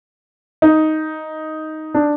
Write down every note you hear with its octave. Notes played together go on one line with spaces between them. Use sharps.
D#4
D4